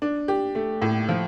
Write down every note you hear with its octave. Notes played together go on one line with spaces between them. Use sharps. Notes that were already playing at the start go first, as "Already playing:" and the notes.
D4
G4
A3
A2
F3